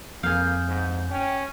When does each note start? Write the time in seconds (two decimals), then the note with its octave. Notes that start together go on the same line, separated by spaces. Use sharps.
0.23 F2 A#3 G#4 F5 G6
0.68 G#2
1.10 C#4 G5